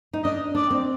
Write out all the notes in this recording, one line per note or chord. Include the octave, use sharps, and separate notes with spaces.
D#4
D4 D#5
D4 D5
C4